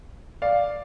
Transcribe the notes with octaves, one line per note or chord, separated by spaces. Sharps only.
D5 F5